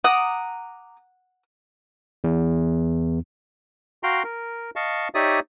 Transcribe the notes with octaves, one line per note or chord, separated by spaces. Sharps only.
F#5 A#5 D6 D#6
E2
F#4 F5 G5 A#5 C6
A#4
D#5 F5 A5 C#6
D#4 G4 C#5 D5 E5 D#6